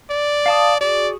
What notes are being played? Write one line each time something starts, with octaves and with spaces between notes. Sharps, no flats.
D5
F5 A5 D#6
F#4 G#4 D5